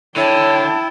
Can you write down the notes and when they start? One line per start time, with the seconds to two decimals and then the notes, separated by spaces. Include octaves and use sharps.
0.16 D3 E4 C#5 G5 A5